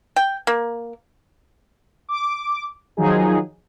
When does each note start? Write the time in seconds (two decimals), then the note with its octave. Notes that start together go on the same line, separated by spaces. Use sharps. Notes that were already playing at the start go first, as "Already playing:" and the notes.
0.16 G5
0.47 A#3
2.09 D6
2.97 D#3 F3 F#3 D#4 G#4